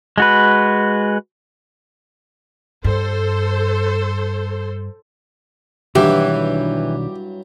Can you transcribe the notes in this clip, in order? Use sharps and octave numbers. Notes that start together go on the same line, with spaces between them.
G#3 F#4 B4
G2 A4 C5
B1 G2 D#3 E3 F#3 D4 G4